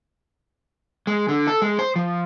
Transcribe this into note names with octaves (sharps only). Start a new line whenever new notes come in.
G#3
D3
A4
G#3
C5
F3